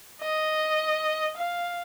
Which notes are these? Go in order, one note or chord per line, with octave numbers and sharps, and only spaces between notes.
D#5
F5